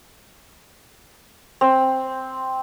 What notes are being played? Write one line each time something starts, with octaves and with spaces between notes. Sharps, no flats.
C4